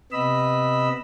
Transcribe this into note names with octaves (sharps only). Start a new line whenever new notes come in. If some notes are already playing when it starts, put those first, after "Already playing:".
C3 B3 D#5 B5 E6